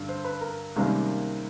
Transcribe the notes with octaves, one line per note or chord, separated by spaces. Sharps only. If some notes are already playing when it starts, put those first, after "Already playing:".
Already playing: G2 D3
C5
B4
A#4
C#2 C3 D#3 G3 A#3